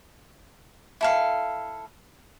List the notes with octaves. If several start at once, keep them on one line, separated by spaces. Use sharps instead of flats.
E4 A4 F5